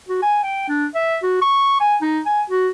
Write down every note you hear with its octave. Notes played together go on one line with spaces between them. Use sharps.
F#4
G#5
G5
D4
E5
F#4
C#6
G#5
D#4
G#5
F#4